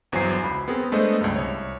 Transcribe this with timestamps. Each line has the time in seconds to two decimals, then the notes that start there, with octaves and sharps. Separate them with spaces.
0.12 G1 E2 F#3 C5 G#5 C7
0.43 C#2 B5
0.68 B3 C4 G#4 A#4
0.92 G#3 A3 B3 D4 C5 D#5
1.21 C#2 G2
1.36 C2 C#5